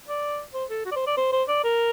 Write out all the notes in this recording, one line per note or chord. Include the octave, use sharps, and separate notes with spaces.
D5
C5
A4
F#4
D5
C5
D5
C5
C5
D5
A#4